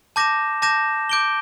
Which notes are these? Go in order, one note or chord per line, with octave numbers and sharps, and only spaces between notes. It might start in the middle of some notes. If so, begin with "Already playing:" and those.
A5 D6 G6 A#6 E7
A5 D6 G6 A#6 E7
D6 G6 D7 G7